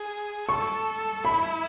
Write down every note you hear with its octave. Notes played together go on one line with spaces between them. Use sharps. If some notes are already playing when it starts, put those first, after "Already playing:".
Already playing: G#4
A4 C#6
E4 B5